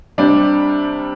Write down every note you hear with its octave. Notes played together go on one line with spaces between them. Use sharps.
C3 G3 D4